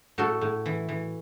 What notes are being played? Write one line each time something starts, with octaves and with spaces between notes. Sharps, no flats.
A2 F#4 A4
A2
E3
E3